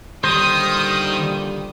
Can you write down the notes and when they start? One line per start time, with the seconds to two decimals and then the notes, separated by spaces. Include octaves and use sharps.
0.24 A#2 D3 D#3 G3 C5 D#6